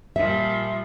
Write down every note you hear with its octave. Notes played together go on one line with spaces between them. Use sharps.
A#2 F3 G3 E5